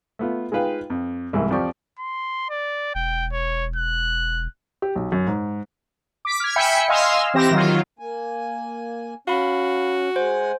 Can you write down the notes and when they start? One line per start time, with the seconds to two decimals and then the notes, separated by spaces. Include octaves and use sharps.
0.19 A3 B3 F4
0.52 G#3 D#4 F4 B4 F5 G5
0.90 F2
1.33 C2 G#2 E3 A#3
1.50 F2 F3 G4 D5 C#6
1.99 C6
2.50 D5
2.95 E1 G5
3.32 C#5
3.76 F#6
4.82 G4
4.96 B1
5.12 F#2
5.27 G#2
6.25 D6 B6
6.40 F6 G#6
6.56 E5 G5 G#5 B5 B6 C#7
6.88 D#5 F5 G#5 C6 E6 F6
7.34 E3 C4 G4 A#6 E7
7.51 D#3 F#3 F4
7.99 A#3 G#5
9.28 C#4 F#4 F5 B5
10.16 G#3 C5 F#5 G#5